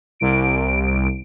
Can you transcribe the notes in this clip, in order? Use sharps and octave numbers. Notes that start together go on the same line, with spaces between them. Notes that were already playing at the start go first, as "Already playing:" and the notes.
C2 D7